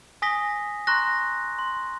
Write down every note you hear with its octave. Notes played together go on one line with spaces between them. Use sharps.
G#5 D#6 A#6 B6 G7
A#5 C6 C#6 F#6 A#6
C6